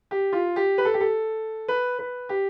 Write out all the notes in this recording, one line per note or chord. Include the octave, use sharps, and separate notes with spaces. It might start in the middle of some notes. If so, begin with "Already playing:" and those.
G4
F4
G4
B4
A4
G4
A4
B4
B4
G4